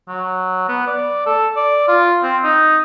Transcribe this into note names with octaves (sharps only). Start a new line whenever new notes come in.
F#3
B3
D5
A4
D5
F4
C4
D#4